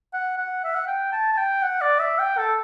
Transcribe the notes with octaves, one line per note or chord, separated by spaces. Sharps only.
F#5
F#5
E5
F#5
G5
A5
A5
G5
F#5
D5
E5
G5
A4